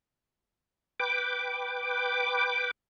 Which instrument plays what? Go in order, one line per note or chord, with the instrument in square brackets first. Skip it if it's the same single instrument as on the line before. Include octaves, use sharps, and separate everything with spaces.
[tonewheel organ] B4 G5 D6